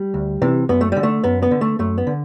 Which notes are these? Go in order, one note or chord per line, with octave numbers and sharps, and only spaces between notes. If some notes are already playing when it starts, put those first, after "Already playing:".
Already playing: G3
D2
C3 E3
F#2 B3
A3
D3 G3
A3
F#2 B3
B3
D3
A3
F#2 A3
B3
D3